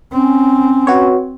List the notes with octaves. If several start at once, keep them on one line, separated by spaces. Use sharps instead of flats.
C4 C#4
F#4 B4 C#5